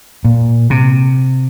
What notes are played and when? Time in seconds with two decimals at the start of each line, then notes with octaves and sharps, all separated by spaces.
0.25 A#2
0.70 C3